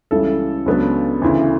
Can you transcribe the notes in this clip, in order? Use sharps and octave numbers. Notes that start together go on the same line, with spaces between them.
C#2 C#3 E3 G3 A4
C#2 C#3 F#3 B3 D4
D2 C#3 E3